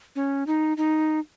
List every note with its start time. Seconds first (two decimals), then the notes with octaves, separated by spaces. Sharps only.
0.16 C#4
0.47 D#4
0.77 D#4